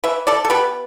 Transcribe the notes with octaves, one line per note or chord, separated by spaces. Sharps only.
E3 B4 E5
A4 D5
A4
B3 G4 B4